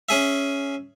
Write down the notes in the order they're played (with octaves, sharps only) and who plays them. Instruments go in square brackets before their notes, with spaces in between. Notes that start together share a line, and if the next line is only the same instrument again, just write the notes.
[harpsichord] C#4 G#4 E5